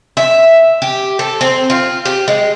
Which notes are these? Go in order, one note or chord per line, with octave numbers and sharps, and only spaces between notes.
E5
G4
A4
C4
F4
G4
G#3